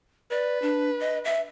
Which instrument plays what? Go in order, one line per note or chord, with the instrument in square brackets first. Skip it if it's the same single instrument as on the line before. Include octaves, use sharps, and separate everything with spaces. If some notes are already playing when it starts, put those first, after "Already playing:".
[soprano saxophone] B4 [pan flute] D5
[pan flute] D4
D#5
E5